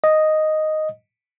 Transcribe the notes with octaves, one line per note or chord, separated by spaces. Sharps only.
D#5